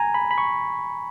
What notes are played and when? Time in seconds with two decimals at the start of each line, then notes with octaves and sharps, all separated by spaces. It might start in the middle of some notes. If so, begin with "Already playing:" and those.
Already playing: G#5 A#5
0.14 B5
0.31 B5
0.38 C#6